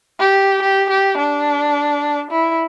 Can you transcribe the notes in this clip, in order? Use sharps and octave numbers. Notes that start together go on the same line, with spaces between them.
G4
G4
G4
D4
E4